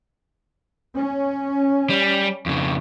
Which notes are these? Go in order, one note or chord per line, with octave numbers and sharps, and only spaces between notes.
C#4
G3
F2 C#3